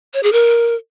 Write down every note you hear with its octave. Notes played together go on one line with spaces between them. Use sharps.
C#5
G#4
A#4